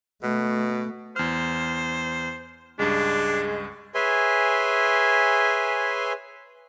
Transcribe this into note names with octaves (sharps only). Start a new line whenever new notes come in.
B2 A3
E2 C5 F6
C#2 G2 G#3 D4
G#4 B4 C#5 E5 G#5 C6